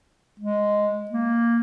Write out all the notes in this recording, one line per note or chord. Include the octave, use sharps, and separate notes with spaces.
G#3
A#3